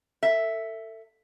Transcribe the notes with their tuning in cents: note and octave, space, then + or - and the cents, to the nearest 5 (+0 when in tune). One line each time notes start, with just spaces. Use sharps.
A4 +30 E5 +0